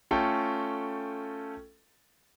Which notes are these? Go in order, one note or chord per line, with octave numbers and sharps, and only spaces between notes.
A3 C#4 F4 A4 G5